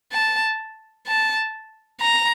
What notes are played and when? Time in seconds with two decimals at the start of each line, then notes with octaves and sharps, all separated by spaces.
0.12 A5
1.07 A5
2.01 A#5